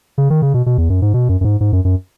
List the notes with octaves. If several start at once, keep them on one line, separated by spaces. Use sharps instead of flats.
C#3
D#3
C#3
B2
B2
E2
F#2
G#2
B2
F#2
F#2
G#2
G#2
F#2
F#2